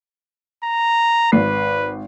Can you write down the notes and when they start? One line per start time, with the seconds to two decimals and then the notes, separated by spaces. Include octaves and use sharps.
0.64 A#5
1.32 G#1 B4 C7